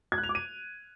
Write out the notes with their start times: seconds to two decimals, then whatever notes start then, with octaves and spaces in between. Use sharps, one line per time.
0.12 G#6
0.18 F#6
0.23 F7
0.29 D6
0.35 D#7